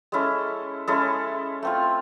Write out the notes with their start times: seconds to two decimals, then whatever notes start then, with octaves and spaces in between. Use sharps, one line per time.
0.12 G#3 C#4 E4 A4
0.88 G#3 C#4 E4 A4
1.63 A3 C4 F4